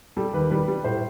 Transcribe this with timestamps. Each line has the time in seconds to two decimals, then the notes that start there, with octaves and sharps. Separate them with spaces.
0.17 G3 A4
0.33 D#2 B4
0.51 G3 B4
0.68 G3
0.84 A2 C5